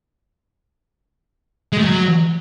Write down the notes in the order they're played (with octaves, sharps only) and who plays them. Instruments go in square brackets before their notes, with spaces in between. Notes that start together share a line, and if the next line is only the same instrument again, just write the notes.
[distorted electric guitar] G#3
A3
F#3